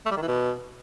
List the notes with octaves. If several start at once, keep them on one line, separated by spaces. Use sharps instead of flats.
A3
G3
D#3
E3
B2